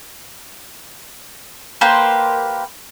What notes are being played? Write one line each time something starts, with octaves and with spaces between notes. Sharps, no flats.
A#3 G4 B4 C5